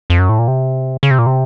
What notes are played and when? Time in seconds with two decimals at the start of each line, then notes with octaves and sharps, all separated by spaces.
0.10 F2
0.19 F#2
0.29 A2
0.39 A#2
0.48 C3
1.03 C#3
1.11 C3
1.19 A#2
1.26 C3